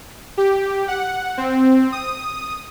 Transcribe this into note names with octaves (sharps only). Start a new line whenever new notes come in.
G4
F#5
C4
D#6